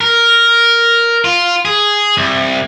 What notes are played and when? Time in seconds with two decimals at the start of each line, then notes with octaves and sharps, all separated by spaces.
0.01 A#4
1.24 F4
1.65 G#4
2.17 C2